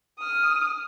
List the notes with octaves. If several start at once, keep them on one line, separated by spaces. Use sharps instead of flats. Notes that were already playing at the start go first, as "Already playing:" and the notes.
D#6 F6